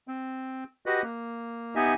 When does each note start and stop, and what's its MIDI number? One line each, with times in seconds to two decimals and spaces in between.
0.08 0.64 60
0.86 1.02 66
0.86 1.02 67
0.86 1.02 71
0.86 1.02 75
1.03 1.75 58
1.76 1.94 59
1.76 1.94 63
1.76 1.94 67
1.76 1.94 76
1.76 1.94 80